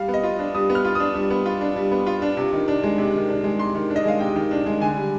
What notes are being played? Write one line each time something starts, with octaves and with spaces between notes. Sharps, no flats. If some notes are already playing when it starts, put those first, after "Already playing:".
Already playing: G3 F5
B3
D#5
F4
D4
G3 D#6
B3
F6
F4
D4 D#6
G3
B3
F4
D4
G3
B3
F4
D4
C3
D#3
D4
G#3
C3
D#3
D4
G#3
C3 C6
D#3
D4
D#5
G#3 F5
C3 G5
D#3
D4
G#3
D3 G#5
G3